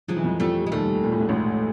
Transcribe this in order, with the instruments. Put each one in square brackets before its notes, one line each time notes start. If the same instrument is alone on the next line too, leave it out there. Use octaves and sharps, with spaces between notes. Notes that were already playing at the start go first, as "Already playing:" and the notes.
[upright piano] F3 [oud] F#3 G#3
[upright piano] E3
F2 F3
[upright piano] F2 F3 [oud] G3 A3
[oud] G#3
[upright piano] D#2 D#3 [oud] G3 A3
[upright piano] A#2
A2
G#2
A1 A2